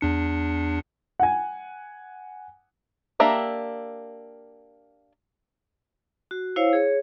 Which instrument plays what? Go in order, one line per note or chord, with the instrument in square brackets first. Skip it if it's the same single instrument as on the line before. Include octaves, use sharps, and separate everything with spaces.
[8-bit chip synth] E2 D4 C#7
[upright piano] F#5 G#5
[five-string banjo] A#3 D4 G4 E5 A#5
[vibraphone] F#4
E4 C5 C#5 F5
G#4 C#5